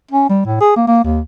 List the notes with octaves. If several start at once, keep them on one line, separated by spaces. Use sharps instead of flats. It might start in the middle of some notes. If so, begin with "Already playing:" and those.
C#4
G3
A2
G#4
A#3
A#3
D#2